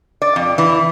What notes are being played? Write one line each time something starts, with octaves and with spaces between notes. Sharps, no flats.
D5
F2
E3